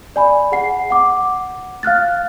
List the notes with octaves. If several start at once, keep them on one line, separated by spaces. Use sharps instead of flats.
D5 G#5 B5
G#4 F#5 C7
F#5 D6
F5 F6 F#6 A6